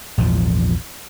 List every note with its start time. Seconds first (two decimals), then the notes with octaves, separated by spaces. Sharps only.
0.18 A#1 E2 G#2 F3